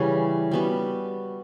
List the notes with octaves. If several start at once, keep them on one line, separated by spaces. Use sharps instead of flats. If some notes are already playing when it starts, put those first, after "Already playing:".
Already playing: C#3 E3 G3 C#4
G3 B3 F#4